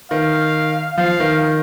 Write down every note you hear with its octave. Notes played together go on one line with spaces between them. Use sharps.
D#3 F5
F3 F5
D#3